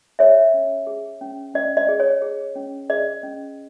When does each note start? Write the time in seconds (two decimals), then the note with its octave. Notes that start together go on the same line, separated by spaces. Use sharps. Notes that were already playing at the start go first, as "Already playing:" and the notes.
0.19 G#4 C#5 E5
0.54 C#4
0.87 G#4
1.21 C#4
1.54 C#4 D#5
1.77 D#5
1.89 G#4
2.00 C#5
2.22 G#4
2.56 C#4
2.90 G#4 D#5
3.23 C#4